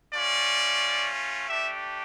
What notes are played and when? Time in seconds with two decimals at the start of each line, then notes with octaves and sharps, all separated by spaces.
0.14 A3 C#4 F4 D5
1.49 A3 D4 G4 E5